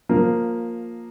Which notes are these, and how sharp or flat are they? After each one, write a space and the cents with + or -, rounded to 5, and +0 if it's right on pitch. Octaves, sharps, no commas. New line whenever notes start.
F3 +15 A#3 +0